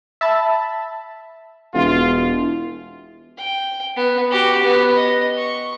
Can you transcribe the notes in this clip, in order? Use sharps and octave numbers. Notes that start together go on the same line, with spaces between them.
E5 A5 B5
E1 F4
G5
B3
F#4 G4
B3
D#5
C#6